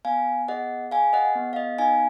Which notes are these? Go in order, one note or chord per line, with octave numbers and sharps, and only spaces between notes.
B3 F5 G#5
G#4 D#5 F#5
G#4 F5 G#5
D#5 F#5
B3
F5
D#5
D#4 F5 G#5